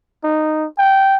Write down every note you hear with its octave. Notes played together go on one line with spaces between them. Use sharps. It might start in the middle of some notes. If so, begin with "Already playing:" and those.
D#4
G5